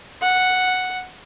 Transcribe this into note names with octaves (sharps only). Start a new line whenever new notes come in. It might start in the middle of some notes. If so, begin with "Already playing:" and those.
F#5